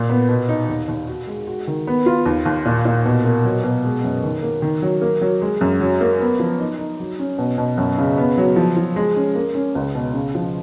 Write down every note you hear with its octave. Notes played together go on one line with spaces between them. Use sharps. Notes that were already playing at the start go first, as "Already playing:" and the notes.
Already playing: A#2
B3
B2
D#4
D#2
D#2
F#4
G#3
F#4
D#3
B3
F4
D#2
D#2
A#2
A#2
B2
A#3
F#3
B2
G#3
F#2
D#3
A#3
D#3
F#3
A#3
F#3
G#3
F#2
F#3
A#3
B3
F3
D#4
D#4
F#3
C#4
B2
B2
F#2
C#3
B3
F#3
F3
F3
G#3
C#4
A#3
C#4
C#2
B2
C#3
F3